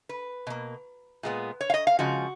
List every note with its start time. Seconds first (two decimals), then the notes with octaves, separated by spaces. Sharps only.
0.09 B4
0.47 B2 A#3
1.23 A#2 G#3 B3
1.61 C#5
1.70 F5
1.74 D#5
1.87 F5
1.99 C#3 F3 G#3 F#4